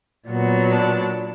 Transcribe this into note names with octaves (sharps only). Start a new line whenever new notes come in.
A#2 F#3 B3
D4